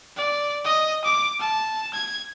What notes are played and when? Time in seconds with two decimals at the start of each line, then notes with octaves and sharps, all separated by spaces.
0.17 D5
0.65 D#5
1.04 D6
1.40 A5
1.94 G#6